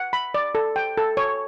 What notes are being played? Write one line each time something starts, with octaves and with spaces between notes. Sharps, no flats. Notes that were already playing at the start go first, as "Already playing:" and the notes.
Already playing: F#5
B5
D5
A4
G5
A4
C#5